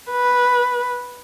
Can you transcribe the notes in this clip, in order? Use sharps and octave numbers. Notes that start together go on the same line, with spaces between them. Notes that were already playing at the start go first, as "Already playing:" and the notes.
B4